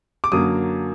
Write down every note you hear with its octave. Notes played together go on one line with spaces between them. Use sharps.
D6
F#2 D3 F#3 A#3 D#6